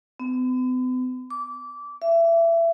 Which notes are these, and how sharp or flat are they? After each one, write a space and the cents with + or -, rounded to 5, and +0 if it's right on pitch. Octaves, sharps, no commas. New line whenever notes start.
B3 +45
D6 -20
E5 +25